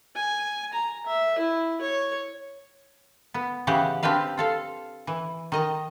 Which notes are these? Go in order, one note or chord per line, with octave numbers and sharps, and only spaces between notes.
G#5
A#5
E5
E4
C#5
B3
C#3 E3 G4 F#5
C4 D4 G4 B4 F5
F4 A4 F5
E3
D#3 D#5 A#5